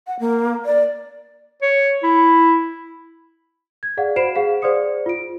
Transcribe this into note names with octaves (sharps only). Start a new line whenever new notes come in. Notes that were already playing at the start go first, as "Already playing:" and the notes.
F#5
A#3
D5
C#5
E4
G#6
G#4 D5 F5 F#5
F#4 C5 B5 C7 D7 E7
G#4 F5 F#5
G#4 C5 D5 C6 D#6 C#7
F4 D7